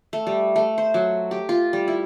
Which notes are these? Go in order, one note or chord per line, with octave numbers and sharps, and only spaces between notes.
A3
G3
A3
C5
F#3
G4
F4
G3
E4